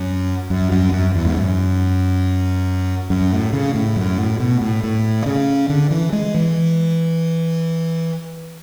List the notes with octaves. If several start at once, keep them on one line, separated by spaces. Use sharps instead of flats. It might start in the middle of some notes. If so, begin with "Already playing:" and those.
Already playing: F#2
F#2
F#2
F#2
E2
G#2
F#2
F#2
A2
C#3
A2
F#2
A2
B2
A2
A2
C#3
D3
E3
G#3
E3